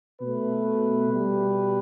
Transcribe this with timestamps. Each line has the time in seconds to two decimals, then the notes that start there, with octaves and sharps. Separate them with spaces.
0.21 B2 A3 B4
1.11 B2 G3